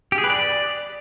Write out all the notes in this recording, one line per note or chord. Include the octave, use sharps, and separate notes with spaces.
G4
G#4
B4
D5